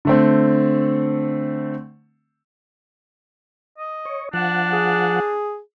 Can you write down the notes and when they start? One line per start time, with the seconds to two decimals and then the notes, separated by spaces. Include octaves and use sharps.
0.05 D3 A3 C4
3.78 D#5
4.05 C#5
4.33 F3 D4 F#5
4.73 G#4